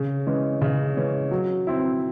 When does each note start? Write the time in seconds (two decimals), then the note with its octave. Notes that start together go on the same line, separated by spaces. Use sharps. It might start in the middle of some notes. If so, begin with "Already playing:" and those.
Already playing: C#3
0.27 E3 G#3 C#4
0.62 C#3
0.97 E3 G#3 C#4
1.31 F#3
1.67 C4 E4